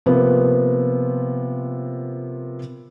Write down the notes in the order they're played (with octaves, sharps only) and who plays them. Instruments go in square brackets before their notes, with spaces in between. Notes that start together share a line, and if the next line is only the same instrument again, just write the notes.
[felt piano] C3 F3 A#3 B3